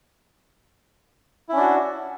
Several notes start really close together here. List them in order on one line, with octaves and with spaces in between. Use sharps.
E4 C#4 D4 F#4